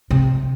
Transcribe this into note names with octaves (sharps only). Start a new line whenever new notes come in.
C3